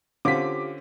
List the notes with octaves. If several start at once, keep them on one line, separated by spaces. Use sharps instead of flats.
D3 C4 C#4 F4 G4 F5 D6 B6